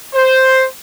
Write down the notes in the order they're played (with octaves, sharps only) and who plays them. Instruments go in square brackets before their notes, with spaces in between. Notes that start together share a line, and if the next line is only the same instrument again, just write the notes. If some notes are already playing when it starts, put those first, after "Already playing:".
[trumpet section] C5